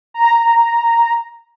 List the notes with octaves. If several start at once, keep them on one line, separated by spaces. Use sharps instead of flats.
A#5